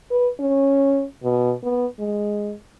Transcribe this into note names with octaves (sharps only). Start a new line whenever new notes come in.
B4
C#4
B2
B3
G#3